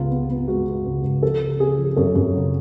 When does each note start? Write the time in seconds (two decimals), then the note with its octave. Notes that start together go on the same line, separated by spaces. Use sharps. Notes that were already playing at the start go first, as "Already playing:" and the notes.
Already playing: C#2 B3 F4
0.11 B3
0.30 B3
0.48 G#3 F#4
0.67 G#3
0.86 C#2
1.04 C#2
1.23 F3 A4
1.41 C#3
1.60 C#3 G#4
1.78 F3
1.96 F#2 A4
2.15 F#2
2.35 C#3